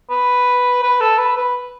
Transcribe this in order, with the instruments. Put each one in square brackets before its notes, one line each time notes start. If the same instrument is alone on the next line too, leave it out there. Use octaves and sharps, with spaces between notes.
[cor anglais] B4
B4
A4
B4
B4